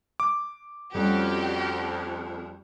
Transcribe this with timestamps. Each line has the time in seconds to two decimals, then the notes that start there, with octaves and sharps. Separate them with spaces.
0.20 D6
0.95 F2 G3 A3 C#4 F#4 G4 D5